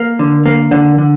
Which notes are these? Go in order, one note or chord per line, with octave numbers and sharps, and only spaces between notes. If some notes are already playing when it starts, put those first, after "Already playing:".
Already playing: A#3
D3
A#3
D3
D3